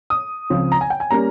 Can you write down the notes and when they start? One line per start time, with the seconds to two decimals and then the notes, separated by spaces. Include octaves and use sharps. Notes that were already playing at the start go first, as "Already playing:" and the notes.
0.10 D#6
0.50 C#2 C#3 F3 C4
0.72 A#5
0.81 G#5
0.90 G5
1.00 G#5
1.11 G3 A#3 C#4 A#5